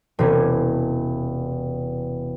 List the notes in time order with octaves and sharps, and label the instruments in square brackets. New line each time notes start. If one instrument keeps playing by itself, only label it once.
[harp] E1 C3 C#4 G#6